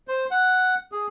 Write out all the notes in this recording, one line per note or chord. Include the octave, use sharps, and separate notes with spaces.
C5
F#5
G#4